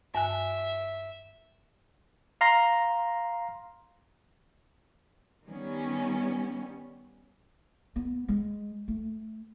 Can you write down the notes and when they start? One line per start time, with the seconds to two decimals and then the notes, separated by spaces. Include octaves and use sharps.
0.15 G2 E5 G#5 F#6
2.41 F5 A#5 C6 A#6
5.46 D#3 G3 B3 C#4
7.96 B3
8.28 G#3
8.88 A3